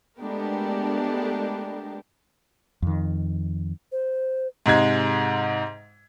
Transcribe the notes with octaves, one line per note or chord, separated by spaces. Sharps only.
G#3 A3 B3 D4 G4 A#4
F2 D#3
C5
G#2 C3 G#3 G#6